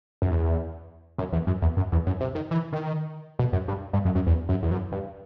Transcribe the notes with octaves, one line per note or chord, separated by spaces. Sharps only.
F#2
E2
F#2
E2
F#2
E2
F#2
E2
F#2
C3
D#3
E3
D#3
B2
F#2
G2
G2
F#2
F#2
E2
F#2
E2
F#2
G2